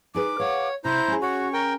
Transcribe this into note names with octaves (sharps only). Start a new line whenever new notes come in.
D#4 G#4 B4 D6
C#5 F5 F#5
C3 E4 C5 A#5 G6
C#4 G#4
F#4 C#5
A#4 G5